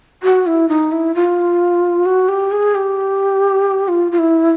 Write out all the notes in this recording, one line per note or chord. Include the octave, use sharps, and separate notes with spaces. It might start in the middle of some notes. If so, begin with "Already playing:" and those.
F#4
E4
D#4
E4
F4
F#4
G4
G#4
G4
F4
F4
E4